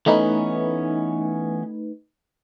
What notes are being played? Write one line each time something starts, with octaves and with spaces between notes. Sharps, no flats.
E3 A3 B3 C#4 D#4 B4